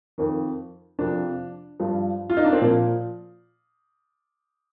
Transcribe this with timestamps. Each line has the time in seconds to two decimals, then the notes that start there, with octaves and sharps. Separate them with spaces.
0.18 F2 D#3
0.99 F2 C3 F3 D4
1.80 G2 F3
2.30 F4
2.37 D#4
2.44 D4
2.53 C4
2.61 A#2 F3 A#3